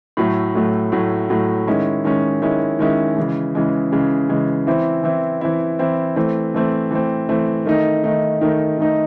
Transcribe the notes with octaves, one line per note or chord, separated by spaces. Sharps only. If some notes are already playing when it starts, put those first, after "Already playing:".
A2 F#3 A3
A2 F#3 A3
A2 F#3 A3
A2 F#3 A3
D#3 G#3 C#4 E4
D#3 G#3 C#4 E4
D#3 G#3 C#4 E4
D#3 G#3 C#4 E4
C#3 E3 G#3
C#3 E3 G#3
C#3 E3 G#3
C#3 E3 G#3
E3 C4 E4
E3 C4 E4
E3 C4 E4
E3 C4 E4
E3 A3 C4
E3 A3 C4
E3 A3 C4
E3 A3 C4
D#3 A3 D#4
D#3 A3 D#4
D#3 A3 D#4
D#3 A3 D#4